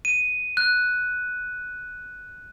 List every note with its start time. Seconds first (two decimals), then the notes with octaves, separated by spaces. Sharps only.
0.05 D#7
0.57 F#6